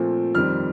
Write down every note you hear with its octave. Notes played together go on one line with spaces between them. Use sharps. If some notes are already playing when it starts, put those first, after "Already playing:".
Already playing: A#2 F3 A3 C4
F2 D#3 G3 C4 F6